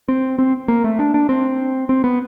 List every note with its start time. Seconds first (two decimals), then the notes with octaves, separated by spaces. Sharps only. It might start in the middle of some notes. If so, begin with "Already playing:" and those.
0.08 C4
0.39 C4
0.68 A#3
0.84 A3
0.99 D4
1.14 D4
1.29 C4
1.89 C4
2.04 B3